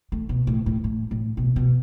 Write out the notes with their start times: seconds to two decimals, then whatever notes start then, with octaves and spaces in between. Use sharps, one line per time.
0.12 A3
0.29 B2
0.47 A2
0.66 A2
0.84 A2
1.11 A2
1.37 B2
1.56 B2